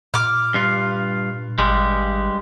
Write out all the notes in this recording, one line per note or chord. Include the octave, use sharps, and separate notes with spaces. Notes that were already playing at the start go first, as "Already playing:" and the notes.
A#2 D6 F6
G2 F4
G#1 G2 G3 G#3